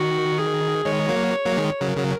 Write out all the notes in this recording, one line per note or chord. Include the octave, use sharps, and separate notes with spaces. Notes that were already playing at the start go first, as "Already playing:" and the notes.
Already playing: D#3 F#4
G#4
D#3 G#3 C#5
F#3 A#3
F#3 A#3
D#3 G#3
C#3 F#3 A#4
C#3 F#3